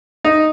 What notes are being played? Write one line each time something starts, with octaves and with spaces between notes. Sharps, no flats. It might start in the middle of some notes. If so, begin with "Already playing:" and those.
D#4